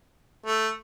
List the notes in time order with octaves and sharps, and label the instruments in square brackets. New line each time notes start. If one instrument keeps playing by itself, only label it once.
[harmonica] A3